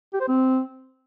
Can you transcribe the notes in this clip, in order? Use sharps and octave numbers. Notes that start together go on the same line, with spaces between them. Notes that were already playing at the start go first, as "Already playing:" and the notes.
G4
C5
C4